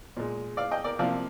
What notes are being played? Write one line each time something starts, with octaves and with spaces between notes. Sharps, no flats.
A#2 G#3
D5 F5
D#5 G5
A#4 D5
C3 F3 A#3 D5 F5